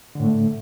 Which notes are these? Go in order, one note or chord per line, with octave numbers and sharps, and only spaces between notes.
A2 D3 A3